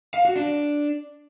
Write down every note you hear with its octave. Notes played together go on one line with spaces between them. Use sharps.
F5
F#4
D4